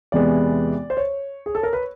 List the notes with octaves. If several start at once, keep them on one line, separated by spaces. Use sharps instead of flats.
E2 C3 E3 G#3 B3 D5
C5
C#5
G#4
A4
A#4
B4